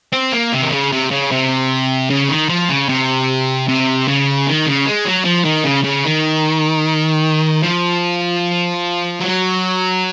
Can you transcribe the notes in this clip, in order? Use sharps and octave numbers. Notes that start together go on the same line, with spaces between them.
C4
A#3
C3
D#3
C#3
C3
C#3
C3
C#3
D#3
F3
C#3
C3
C3
C#3
D#3
C#3
G#3
F#3
F3
D#3
C#3
C#3
D#3
F3
F#3